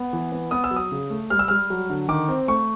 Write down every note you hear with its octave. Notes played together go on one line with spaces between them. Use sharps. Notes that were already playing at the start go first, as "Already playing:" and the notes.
Already playing: B3
E3
B3
B3 D#6
E6
F#3
D#6
C#3
A3
G3 F6
E6
G3 F6
F#3
D3
D#3 D6
C4
A3 C#6